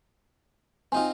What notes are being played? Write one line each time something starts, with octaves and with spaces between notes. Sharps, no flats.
C4 D#4 F4 G#5